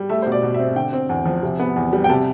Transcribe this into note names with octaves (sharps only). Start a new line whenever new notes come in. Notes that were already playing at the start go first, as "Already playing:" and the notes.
Already playing: G3
A3 E5
B2 C5
D5
B2
E5
C4
D3 G5
C4
E2
F3
C3
B3
E2
G3
G5
C3 A5